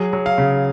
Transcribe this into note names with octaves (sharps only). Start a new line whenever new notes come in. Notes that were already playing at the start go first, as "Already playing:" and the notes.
Already playing: F#3 G#4
F#3
F5
C#3